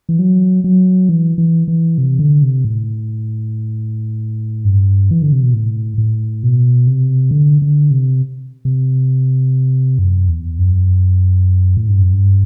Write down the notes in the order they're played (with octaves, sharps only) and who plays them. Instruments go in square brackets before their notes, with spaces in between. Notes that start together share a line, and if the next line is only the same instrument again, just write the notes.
[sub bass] E3
F#3
F#3
E3
E3
E3
C3
D3
C3
A2
G2
E3
D3
C3
B2
A2
A2
B2
C3
D3
D3
C3
C3
F#2
E2
F#2
A2
G2
F#2
G2